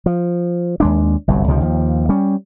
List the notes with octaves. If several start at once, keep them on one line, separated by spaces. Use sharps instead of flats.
F3
D#2 G#3 D4
G1 C2 F#2
C#2 C3 D#3 F3
D#2 F3
G3 C#4